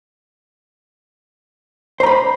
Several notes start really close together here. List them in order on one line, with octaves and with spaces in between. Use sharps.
C5 A#5 B5